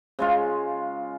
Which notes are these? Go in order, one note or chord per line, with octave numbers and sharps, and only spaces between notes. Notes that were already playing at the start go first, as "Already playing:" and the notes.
C#3 G#3 F4